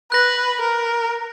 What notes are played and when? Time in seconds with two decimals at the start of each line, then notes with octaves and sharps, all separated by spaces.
0.12 B4 F#6 A#6
0.61 A#4